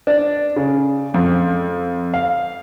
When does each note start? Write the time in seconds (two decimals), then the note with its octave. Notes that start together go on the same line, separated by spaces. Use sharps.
0.07 D4
0.56 C#3
1.14 F2
2.14 F5